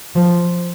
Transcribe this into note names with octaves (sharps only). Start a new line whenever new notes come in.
F3